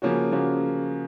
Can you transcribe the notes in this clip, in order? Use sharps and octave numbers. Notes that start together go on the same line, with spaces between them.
C#3 F3 A#3 C#4 F#4
C#3 F3 A#3 C#4 F#4